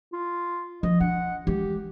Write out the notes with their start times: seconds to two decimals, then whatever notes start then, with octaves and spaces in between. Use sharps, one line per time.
0.13 F4
0.83 F3 D#5
1.00 D4 F#5
1.47 E3 G#3 G4